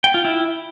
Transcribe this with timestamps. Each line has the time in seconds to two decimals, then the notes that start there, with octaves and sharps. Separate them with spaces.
0.04 G5
0.14 F4
0.25 E4